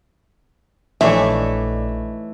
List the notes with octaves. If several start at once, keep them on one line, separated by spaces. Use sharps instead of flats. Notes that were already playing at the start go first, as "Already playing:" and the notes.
A#1 E3 A3 D4 D#4 C#5 D5 E5